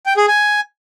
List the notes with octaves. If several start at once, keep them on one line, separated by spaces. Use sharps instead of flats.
G5
G#4
G#5